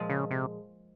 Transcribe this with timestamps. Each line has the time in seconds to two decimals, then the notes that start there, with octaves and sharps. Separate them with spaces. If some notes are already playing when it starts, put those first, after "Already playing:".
Already playing: A#2 F3 G#3
0.10 C#3
0.31 C3